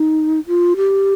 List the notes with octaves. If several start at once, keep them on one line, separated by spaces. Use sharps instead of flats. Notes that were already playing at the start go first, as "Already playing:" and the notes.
Already playing: D#4
F4
G4